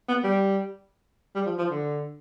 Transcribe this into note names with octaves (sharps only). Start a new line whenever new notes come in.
B3
G3
G3
F3
F3
D3